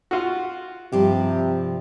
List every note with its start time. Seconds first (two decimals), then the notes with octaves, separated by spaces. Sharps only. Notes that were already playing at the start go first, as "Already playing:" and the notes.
0.11 F4 F#4
0.92 G2 C3 F3 G4